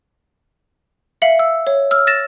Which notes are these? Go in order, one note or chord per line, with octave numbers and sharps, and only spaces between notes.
E5 F5 C#7 F#7
E6
C#5
E6 F6
A6 A#6 E7